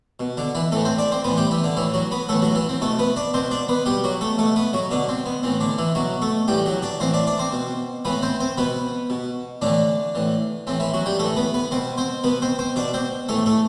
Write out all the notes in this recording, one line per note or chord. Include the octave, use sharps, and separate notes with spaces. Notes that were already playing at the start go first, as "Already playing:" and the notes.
B2
D3 D4
E3 E4
A2 E3 A3 A4
C4 C5
D4 D5
C4 C5
A2 E3 B3 B4
G3 G4
E3 E4
D3 D4
A2 E3 E4
F#3 F#4
B3 B4
A2 E3 A3 A4
F#3 F#4
E3 E4
C4
B2 A3 A4
B3 B4
D4 D5
B2 C4 C5
D4 D5
B3 B4
B2 G3 G4
F#3 F#4
A3 A4
B2 A3 A4
B3 B4
F#3 F#4
B2 D3 D4
C4
B3
A2 E3 C4
D3 D4
E3 E4
B2 F#3 F#4
A3 A4
A2 E3 G3 G4
F#3 F#4
D4 D5
A2 E3 C4 C5
D4 D5
D4 D5
C4 C5
B2
A2 E3 B3 B4
C4 C5
C4 C5
B2 B3 B4
B2
A2 D3 E3 D4
A2 E3
A2 E3 C4
E3 E4
F#3 F#4
G3 G4
A2 E3 A3 A4
B3 B4
B3 B4
B2 C4 C5
C4 C5
B2 B3 B4
C4 C5
C4 C5
B2 D4 D5
C4 C5
A2 E3 A3 A4
A3 A4